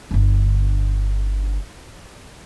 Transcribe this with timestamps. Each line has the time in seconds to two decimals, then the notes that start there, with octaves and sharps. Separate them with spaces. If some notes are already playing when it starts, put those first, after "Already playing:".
0.11 G1 D3